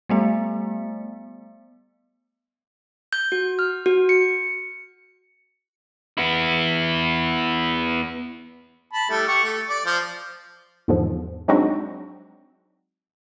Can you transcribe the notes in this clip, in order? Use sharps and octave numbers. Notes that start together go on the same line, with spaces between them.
G3 A3 B3
G6
F#4
F6
F#4
C#7
B3 E4
A5 B5
G3 A3 E4
G4 F#5 C#6
A3
D5
F3 C5
E2 G#2 D3 F3
F#3 G#3 C4 D4 D#4 F#4